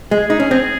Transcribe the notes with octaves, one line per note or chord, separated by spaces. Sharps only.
G#3 G#4
D#4
C#4
C4 G#4